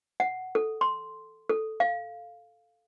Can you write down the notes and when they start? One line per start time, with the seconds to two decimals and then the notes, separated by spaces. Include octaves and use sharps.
0.20 F#5
0.55 A4
0.81 C6
1.49 A4
1.80 F5